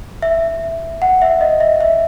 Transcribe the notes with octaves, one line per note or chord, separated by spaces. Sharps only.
E5
F#5
E5
D#5
E5
E5